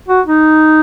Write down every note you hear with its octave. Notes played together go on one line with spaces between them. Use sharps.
F#4
D#4